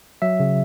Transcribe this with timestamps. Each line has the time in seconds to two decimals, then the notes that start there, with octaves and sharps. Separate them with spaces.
0.22 F#3 E5
0.40 C#3